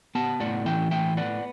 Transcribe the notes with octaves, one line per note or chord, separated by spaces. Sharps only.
B3 F#5 A5
A2 D5 F#5
E3 E5 G5
A2 E5 G5
B3 D5 F#5